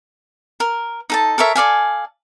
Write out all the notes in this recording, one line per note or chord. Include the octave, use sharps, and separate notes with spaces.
A#4
D#4 A4 A5
A4 A#4 C#5 E5
A4 D5 F5 G#5